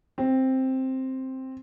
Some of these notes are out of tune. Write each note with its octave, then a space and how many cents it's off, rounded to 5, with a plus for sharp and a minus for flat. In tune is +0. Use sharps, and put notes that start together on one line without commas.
C4 +5